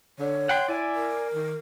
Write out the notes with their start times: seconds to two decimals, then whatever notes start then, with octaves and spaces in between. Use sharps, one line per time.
0.19 D3 C#5
0.49 F#5 G5 C6
0.68 E4 D5 G#5
0.96 A#4
1.34 D#3